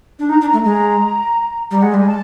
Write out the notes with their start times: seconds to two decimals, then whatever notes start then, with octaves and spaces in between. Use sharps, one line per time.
0.19 D4
0.29 D#4 A#5
0.41 D4
0.46 A#5
0.53 A3
0.64 G#3 A#5
1.71 G3 A#5
1.79 F#5
1.82 G#3
1.94 G3 G#5
2.06 G#3 A5